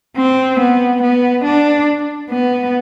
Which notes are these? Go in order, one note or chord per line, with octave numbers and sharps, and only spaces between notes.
C4
B3
B3
D4
B3